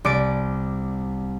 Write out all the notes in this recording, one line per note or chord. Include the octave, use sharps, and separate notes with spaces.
C2 D5 D6 D7